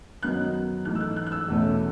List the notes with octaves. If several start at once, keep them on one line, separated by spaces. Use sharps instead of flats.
F#2 D#3 F#3 B3 D#4 F#6
G#2 E3 A3 D#4 F#6
E6
F#6
F#6
F#6
E6
E2 B2 A3 C#4